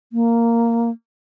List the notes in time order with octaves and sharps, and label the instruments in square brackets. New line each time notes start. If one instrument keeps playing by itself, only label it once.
[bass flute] A#3